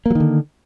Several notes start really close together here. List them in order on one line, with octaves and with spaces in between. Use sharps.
A#3 F#3 D#3 D3